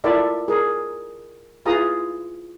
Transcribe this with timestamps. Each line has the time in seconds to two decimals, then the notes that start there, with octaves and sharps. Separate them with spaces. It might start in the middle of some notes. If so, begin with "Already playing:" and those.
0.04 E4 F4 A4 A#4 D5 E5
0.48 G#4 A#4
1.65 E4 F4 G#4 B4 A#5 D#6